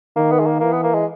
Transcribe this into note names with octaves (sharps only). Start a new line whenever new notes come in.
D#3 A#3
B3
G#3
A#3
E3 A#3
B3
A#3
G#3